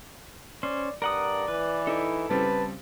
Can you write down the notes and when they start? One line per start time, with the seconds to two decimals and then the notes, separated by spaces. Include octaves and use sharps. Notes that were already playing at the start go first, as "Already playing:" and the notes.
0.63 C#4 C5 D5
1.02 G2 A#4 D5 F#5 D#6
1.48 E3 B4
1.87 D#4 E4 A4
2.30 C#3 G3 C4 B4 A5